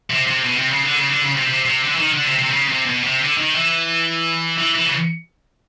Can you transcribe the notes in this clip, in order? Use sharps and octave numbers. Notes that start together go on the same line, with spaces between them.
C3
C3
B2
C3
C#3
D3
C#3
D3
C#3
C3
C3
C3
D3
E3
D#3
D3
C3
C3
C#3
C3
B2
C3
D3
D#3
E3
E3
E3
C#3